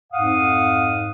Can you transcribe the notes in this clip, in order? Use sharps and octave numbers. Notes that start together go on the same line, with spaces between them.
F2 G#2 F5 F#5 D#6